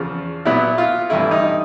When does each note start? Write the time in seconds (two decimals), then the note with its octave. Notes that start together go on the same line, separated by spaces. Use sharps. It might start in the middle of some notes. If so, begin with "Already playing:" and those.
Already playing: E2 C#3 F3
0.45 A#2 F#3 B3 E4
0.78 F4
1.10 G2 E3 A3 E4
1.31 D#4